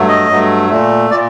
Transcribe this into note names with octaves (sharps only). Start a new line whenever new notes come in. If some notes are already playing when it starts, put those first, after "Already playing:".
Already playing: G2 F#3 A3
D#5
G2 F#3 A3
A#2 A3
A#2 D5